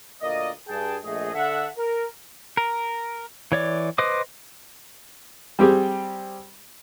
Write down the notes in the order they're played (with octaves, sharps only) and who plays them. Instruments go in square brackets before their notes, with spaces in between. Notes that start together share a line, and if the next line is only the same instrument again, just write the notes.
[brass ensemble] D2 A#2 A#3 D5 D#5
G2 G#4 G5 A5
A#1 A3 G#4 D#5
D3 A4 E5 F#5
A#4
[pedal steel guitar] A#4
E3 C#5 D5
B4 C5 D#5 D6 D#6
[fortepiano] G3 C4 G4 G#4